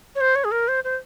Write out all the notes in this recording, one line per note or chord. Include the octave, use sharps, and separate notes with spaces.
C#5
C5
C#5
G#4
A#4
C5
C5